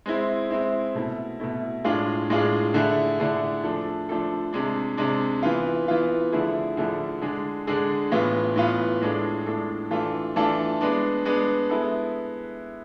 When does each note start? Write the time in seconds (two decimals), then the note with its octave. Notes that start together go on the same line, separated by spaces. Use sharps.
0.06 G#3 C4 E4
0.51 G#3 C4 E4
0.95 B2 A3 E4
1.40 B2 A3 E4
1.84 A2 G#3 D4 F4 G#4
2.30 A2 G#3 D4 F4 G#4
2.74 D3 A3 E4 G#4
3.20 D3 A3 E4 G#4
3.64 F3 A3 D4 A4
4.09 F3 A3 D4 A4
4.53 C3 G#3 D4
4.97 C3 G#3 D4
5.43 E3 B3 F4
5.88 E3 B3 F4
6.32 D3 F3 A3 E4 G#4
6.77 D3 F3 A3 E4 G#4
7.21 D3 G#3 D4 G#4
7.67 D3 G#3 D4 G#4
8.12 A2 E3 B3 F4
8.56 A2 E3 B3 F4
9.01 A2 G#3 D4 A4
9.46 A2 G#3 D4 A4
9.91 E3 A3 D4 F4 A4
10.36 E3 A3 D4 F4 A4
10.81 G#3 B3 D4
11.25 G#3 B3 D4
11.70 G#3 B3 E4 A4